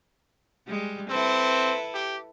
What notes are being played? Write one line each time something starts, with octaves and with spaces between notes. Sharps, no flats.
G3 G#3
C4 E4 A4 B4
G4